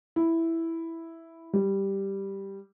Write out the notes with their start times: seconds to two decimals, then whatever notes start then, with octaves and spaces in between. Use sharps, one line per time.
0.16 E4
1.53 G3